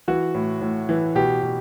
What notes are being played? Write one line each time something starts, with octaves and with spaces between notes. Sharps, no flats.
E3 F#4
A2
A2
E3
B2 G4
B2